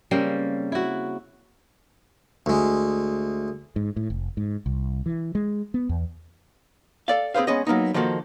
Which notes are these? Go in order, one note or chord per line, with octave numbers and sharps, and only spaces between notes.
C#3 G3 A#3 C4
E4 F#4
D2 G#3
G#2
A2
F1
G#2
C2
E3
G#3
B3
E2
A4 D5 F5
C4 G#4 B4 C5 F5
G#3 B3 C#4 G#4 D#5
F#3 A#3 B3 D#4
D#3 F3 A#3 F#4 A4